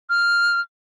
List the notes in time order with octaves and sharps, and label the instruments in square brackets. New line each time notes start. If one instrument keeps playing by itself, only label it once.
[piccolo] F6